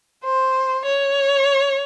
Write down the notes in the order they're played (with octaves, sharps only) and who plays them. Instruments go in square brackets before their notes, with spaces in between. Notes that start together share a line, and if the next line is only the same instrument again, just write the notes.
[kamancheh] C5
C#5